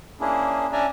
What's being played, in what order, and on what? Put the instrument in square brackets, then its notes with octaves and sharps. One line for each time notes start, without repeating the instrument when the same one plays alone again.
[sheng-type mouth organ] A#3 C#4 D4 E4 G#4
C#4 D4 D5 E5 G#5 A#5